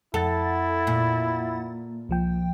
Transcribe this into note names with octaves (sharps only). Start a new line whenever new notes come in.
F2 E4 A4 F#5 A6
A#2
C2 F3 G5